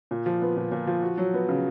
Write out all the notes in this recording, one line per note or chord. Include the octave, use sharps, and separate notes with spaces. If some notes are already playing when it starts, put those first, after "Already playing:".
A#2
F3
B3
A#2
A#2
F3
F#4
F#3
B3
C#3